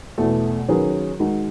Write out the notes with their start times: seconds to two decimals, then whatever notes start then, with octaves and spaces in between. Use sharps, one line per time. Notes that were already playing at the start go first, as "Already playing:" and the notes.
0.18 E2 B2 A3
0.68 D#3 F#3 C#4 G#4 B4
1.19 D#3 G#3 D#4 F#4